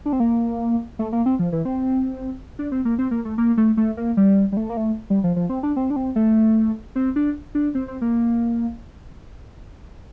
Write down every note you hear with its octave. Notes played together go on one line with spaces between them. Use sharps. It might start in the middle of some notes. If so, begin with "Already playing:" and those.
D4
C4
A#3
A3
A#3
C4
F3
E3
C4
D4
C4
A#3
C4
A#3
A3
A#3
A3
A3
A#3
G3
G3
A3
A#3
A3
G3
F3
F3
C4
D4
C4
D4
C4
A3
C4
D4
D4
C4
C4
A#3